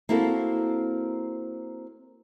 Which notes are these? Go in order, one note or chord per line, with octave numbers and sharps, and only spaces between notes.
A#3 C4 E4 F#4 A4